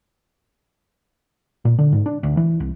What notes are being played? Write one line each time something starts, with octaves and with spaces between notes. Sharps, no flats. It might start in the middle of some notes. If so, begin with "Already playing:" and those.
A#2
D3
G#2
D4
D2
E3
C2